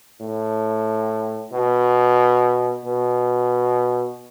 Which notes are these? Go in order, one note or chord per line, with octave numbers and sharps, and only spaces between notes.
A2
B2
B2